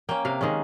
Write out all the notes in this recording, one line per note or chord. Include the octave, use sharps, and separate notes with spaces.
A#3 C#4 G5
C3 F5
D#3 G#3 C#4